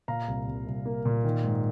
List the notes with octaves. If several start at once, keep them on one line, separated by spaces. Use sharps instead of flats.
A#2 F5 A#5
C2
C2
C2
A#3
A#2
D#3
G#2